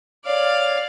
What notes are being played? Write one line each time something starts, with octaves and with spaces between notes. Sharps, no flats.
C#5 D5 F5